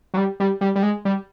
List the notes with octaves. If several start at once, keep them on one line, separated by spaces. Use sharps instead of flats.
F#3
G3
G3
G3
G3
G#3
G3